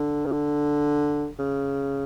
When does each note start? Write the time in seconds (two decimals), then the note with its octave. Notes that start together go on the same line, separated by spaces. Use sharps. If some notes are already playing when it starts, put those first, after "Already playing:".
Already playing: D3
0.26 C#3
0.32 D3
1.39 C#3